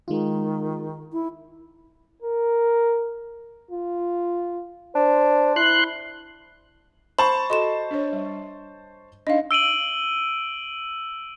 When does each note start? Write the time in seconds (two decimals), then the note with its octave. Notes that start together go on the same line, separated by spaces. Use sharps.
0.08 D#3 G#3 D#4 F4
1.12 E4
2.22 A#4
3.71 F4
4.95 D4 C5
5.56 E4 C6 F#6
7.19 C5 A5 B5 C#6
7.50 F#4 A4 D#5 C6 E7
7.91 D4 C#5
8.13 G3
9.27 D4 D#4 D#5 F5
9.51 E6 D7 D#7 F#7